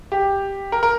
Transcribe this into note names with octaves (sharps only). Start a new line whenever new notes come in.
G4
A#4
A#4